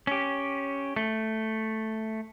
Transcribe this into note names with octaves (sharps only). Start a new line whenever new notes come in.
C#4 G4
A3